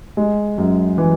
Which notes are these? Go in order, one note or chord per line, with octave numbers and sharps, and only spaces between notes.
G#3
F#2
E3